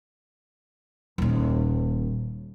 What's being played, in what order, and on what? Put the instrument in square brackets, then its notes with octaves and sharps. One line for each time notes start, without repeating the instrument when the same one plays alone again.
[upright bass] D#1 D#2